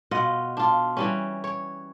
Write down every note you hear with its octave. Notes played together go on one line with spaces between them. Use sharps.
B2 F4 D#5 F#5
D4 F4
E3 G3 C#4
C#5